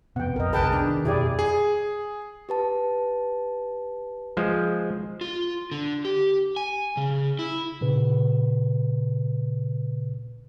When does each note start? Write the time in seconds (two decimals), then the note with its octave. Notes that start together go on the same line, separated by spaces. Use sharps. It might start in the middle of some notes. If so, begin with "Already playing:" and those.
0.16 F2 C3 B3 F#5 G5
0.36 A#1 F2 A#4 D#5
0.53 F1 C2 D3 G#4 A#4 B4 G5 A5
0.72 D4
0.85 D#3
1.05 E1 F2 B2 E4 G4 G#4 D5
1.39 G#4
2.49 G4 B4 A5
4.37 F3 G#3 C5
5.21 F4
5.71 D3
6.05 G4
6.56 G#5
6.97 C#3
7.39 E4
7.81 A#2 C#3 B4